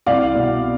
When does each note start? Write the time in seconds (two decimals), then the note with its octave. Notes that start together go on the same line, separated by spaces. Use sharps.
0.07 C2 D5 F5
0.35 B2